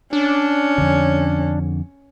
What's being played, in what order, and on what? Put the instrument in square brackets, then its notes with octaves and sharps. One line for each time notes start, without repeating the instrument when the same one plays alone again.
[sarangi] C#4 [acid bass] D4
[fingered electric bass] F2 D3